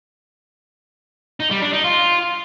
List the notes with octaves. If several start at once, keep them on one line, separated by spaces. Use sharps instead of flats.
D#4
G3
D4
D#4
F4